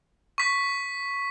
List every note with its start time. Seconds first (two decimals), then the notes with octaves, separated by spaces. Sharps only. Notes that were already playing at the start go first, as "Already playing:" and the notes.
0.38 C#6 B6